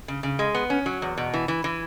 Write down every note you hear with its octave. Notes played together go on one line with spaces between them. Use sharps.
C#3
C#3
G#3
B3
C#4
F#3
E2
B2
E3
E3
E3